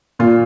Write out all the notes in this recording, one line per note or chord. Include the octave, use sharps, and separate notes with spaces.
A#2 F4